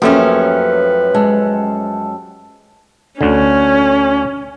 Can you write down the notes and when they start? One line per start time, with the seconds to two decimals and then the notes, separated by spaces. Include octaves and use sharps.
0.02 F#2 F3 A3 A#3 C#4 G4 B4
1.15 G#3 A4
3.21 D2 D3 C#4